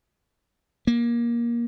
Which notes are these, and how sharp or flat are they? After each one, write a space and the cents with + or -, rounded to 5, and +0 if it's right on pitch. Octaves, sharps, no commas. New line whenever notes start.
A#3 +20